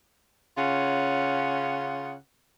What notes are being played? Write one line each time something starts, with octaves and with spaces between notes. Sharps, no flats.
C#3 C#4 F4 F#5